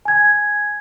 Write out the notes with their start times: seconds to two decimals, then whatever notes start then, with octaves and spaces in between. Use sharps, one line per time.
0.05 G#5 G#6